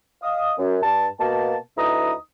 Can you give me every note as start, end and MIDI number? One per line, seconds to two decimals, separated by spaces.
0.23 0.52 75
0.23 0.52 77
0.23 0.52 87
0.57 0.77 42
0.82 1.06 43
0.82 1.06 81
1.20 1.55 47
1.20 1.55 58
1.20 1.55 81
1.77 2.12 38
1.77 2.12 63
1.77 2.12 64
1.77 2.12 71
1.77 2.12 82
1.77 2.12 87